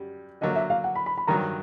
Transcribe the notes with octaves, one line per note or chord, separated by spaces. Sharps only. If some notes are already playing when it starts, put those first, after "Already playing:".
Already playing: F#2 G3
D3 F#3 A#3 D#5
E5
F5
F#5
B5
B5
B5
G2 D#3 F#3 A#5